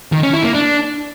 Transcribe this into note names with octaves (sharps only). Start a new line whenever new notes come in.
D#3
C#4
E4
A#3
D4